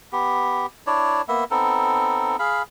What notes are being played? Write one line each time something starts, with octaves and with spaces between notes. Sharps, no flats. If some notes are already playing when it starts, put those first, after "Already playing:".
B3 G4
D4 E4 C#5 D5
A#3 B3 E5
B3 C4 D#4 A4
G#4 F5 B5